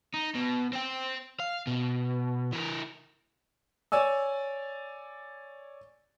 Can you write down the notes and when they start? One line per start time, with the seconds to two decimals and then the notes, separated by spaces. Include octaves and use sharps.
0.14 D#4
0.35 B2
0.73 C4 G5
1.40 F5
1.67 B2
2.52 E3 A#4
3.92 C#5 D5 G#5 E6